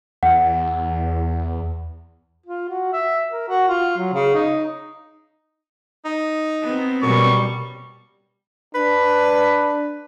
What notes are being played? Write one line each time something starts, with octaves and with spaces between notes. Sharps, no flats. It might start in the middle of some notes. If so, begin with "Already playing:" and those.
E2 F#5
F4
F#4
E5
A#4
F#4
F4
F#3
C#3
D#4
D#4
B3 C4
F#2 B2 G3 C#6
D4 B4